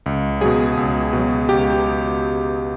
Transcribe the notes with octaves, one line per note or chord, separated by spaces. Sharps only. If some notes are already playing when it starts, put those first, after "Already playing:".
C#2
B2 F#3 G#4
C#2
B2 F#3
C#2 G4